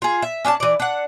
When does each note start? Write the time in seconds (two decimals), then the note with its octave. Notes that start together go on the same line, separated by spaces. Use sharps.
0.02 F4 G#4
0.22 E5
0.45 C#4 D4 F5 A5
0.60 E3 D5
0.80 D4 F#5